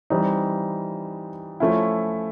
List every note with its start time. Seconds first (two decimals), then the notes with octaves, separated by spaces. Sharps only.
0.10 E3 G3 C4 D#4
1.60 F3 A3 C#4 E4